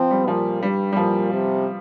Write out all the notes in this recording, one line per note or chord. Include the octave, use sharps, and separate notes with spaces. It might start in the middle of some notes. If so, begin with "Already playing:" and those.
Already playing: F3 C4
G3
A#2 F3
G2 G3
G3
A#2 F3
C3